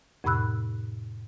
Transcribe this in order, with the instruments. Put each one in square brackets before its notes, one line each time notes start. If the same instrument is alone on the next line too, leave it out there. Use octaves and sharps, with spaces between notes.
[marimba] F2 A2 C3 B5 E6 F#6